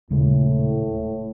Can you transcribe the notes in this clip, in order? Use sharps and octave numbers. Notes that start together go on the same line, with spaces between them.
D#1 A2 C#3 G#3